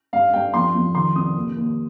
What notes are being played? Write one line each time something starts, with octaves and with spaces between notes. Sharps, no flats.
G2 F5
G2 G5
F2 C6
F2
D#3 C6
C2 D#6
D#2
D#2